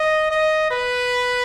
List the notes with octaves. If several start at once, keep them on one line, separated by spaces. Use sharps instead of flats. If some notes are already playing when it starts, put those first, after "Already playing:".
Already playing: D#5
D#5
B4